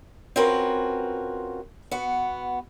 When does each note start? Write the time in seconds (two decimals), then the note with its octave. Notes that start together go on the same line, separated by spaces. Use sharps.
0.36 C4 C#4 F4 F#4 A#4 B4
1.91 B3 F#4